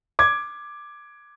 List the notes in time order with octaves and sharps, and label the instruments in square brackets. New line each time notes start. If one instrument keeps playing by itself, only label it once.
[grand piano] D6 G#6